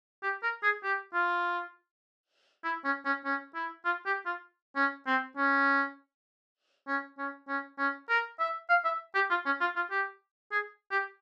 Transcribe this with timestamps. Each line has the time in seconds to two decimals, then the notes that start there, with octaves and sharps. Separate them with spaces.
0.23 G4
0.43 A#4
0.63 G#4
0.83 G4
1.13 F4
2.64 E4
2.85 C#4
3.05 C#4
3.25 C#4
3.55 E4
3.85 F4
4.06 G4
4.26 F4
4.76 C#4
5.06 C4
5.37 C#4
6.88 C#4
7.18 C#4
7.48 C#4
7.78 C#4
8.09 A#4
8.39 E5
8.69 F5
8.85 E5
9.15 G4
9.30 F4
9.46 C#4
9.61 F4
9.76 F4
9.91 G4
10.52 G#4
10.91 G4